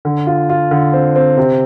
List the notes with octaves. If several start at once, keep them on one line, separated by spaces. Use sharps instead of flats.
D3
F4
F4
D3
C4
C4
C3